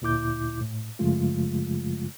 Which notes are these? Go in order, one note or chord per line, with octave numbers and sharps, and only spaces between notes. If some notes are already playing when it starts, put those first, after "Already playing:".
D2 A#2 E4 D6 G6
A2
F#2 C#3 F3 G#3 A3 F4